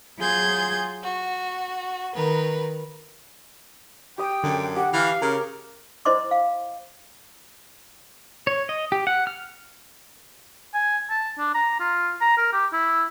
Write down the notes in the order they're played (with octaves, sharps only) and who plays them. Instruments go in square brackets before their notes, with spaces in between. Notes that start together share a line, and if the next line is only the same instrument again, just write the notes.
[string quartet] F#3 F4 G#4 C6 G6 G#6
F#4
D#3 A#4 B4
[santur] G4 D#6 [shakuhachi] G5
[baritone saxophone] F#2 [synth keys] D3
[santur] G4 [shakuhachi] F#5
[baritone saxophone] E3 [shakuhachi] F5 [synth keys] F6
[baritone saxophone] C#3 [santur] A#4
[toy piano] E4 C5 D5 D#5 C6 D6
F5
[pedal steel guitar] C#5
D#5
G4
F#5
F6
[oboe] G#5
A5
D4
A#5
F4
A#5
A#4
G4
E4